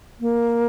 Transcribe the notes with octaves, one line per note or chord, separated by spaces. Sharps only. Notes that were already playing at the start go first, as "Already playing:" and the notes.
A#3